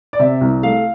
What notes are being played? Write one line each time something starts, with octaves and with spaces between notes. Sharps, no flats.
D5
C3 E5
C2
A3 F5